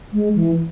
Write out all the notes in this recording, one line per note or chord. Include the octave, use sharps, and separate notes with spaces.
G#3
E3